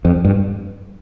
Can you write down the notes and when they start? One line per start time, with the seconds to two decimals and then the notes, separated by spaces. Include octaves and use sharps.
0.05 F2
0.25 G2